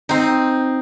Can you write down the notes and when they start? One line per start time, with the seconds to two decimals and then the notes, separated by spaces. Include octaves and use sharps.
0.09 C4 D#4